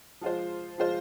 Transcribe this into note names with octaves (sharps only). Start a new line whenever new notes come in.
F3 G#3 F4 C5
F3 G#3 F4 C5